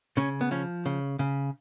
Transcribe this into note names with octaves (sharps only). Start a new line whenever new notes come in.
C#3 C#4
B3
F3 C#4
C#3
C#3